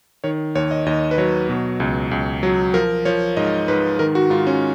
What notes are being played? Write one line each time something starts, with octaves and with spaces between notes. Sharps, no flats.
D#3 C#5
D#2 C#5
D#5
D#2 D#5
B4
F#3 C#5
B2
C#2
C#2
F#3
F3 A#4
F3 C#5
G#2 D#5
G#2 B4
D#3 A#4
F#4
G#2 F4
C#4